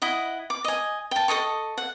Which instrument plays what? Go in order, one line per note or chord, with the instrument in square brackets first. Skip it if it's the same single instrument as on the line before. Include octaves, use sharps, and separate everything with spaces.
[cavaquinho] E4 D#5 F#5
D6
D#5 G#5
G5 A5
A4 C#5 D#5 C#6
F#5